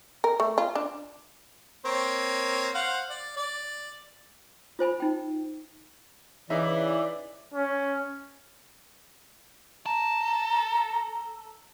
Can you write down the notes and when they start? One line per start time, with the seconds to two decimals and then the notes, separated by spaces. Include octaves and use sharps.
0.24 A#4
0.40 A3
0.58 F4
0.75 D4
1.85 A#3 C4 C#5
2.75 C5 F5 F#5
3.10 D5
3.36 D5
4.79 F4 C5 G#5 B5
5.00 D#4 G5
6.50 C#3 E3 D#4 D5 E5
7.54 C#4
9.86 A4 A#5